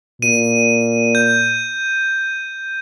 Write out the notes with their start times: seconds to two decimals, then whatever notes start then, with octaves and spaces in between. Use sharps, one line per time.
0.22 A#2 D#7
1.15 G6